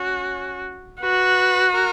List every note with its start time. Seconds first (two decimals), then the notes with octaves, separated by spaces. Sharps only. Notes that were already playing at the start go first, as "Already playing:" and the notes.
Already playing: C#4 F#4
1.01 F#4 B4
1.73 A#4